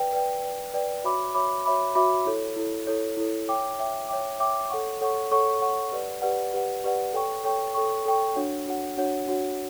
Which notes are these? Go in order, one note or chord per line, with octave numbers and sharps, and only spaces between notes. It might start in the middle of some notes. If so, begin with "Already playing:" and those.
Already playing: B4 D5 G5
B4 D5 G5
B4 D5 G5
B4 D5 G5
F#4 C#5 E5 B5 D6
F#4 C#5 E5 B5 D6
F#4 C#5 E5 B5 D6
F#4 C#5 E5 B5 D6
E4 A4 C#5
E4 A4 C#5
E4 A4 C#5
E4 A4 C#5
C#5 E5 G5 D6
C#5 E5 G5 D6
C#5 E5 G5 D6
C#5 E5 G5 D6
A4 C#5 F#5 C#6
A4 C#5 F#5 C#6
A4 C#5 F#5 C#6
A4 C#5 F#5 C#6
G4 B4 D5 F#5
G4 B4 D5 F#5
G4 B4 D5 F#5
G4 B4 D5 F#5
A4 C#5 G5 C#6
A4 C#5 G5 C#6
A4 C#5 G5 C#6
A4 C#5 G5 C#6
D4 F#4 C#5 F#5
D4 F#4 C#5 F#5
D4 F#4 C#5 F#5
D4 F#4 C#5 F#5